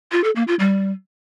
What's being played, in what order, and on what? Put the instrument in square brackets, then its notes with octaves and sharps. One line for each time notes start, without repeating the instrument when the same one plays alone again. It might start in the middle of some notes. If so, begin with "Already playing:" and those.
[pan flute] F4
A4
A#3
F4
G3